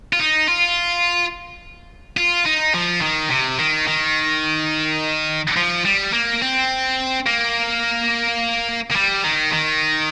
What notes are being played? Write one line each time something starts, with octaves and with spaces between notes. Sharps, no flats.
F4
D#4
F4
F4
D#4
F3
D#3
C3
D#3
D#3
F3
G3
A#3
C4
A#3
A#3
G3
D#3
D#3